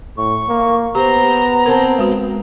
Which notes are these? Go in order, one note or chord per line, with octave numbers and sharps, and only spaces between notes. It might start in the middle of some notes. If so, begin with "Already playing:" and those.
A2 C#6
A#3
B3 G4 C5 A#5
C4 A#4 B4 A5
G#3 F#4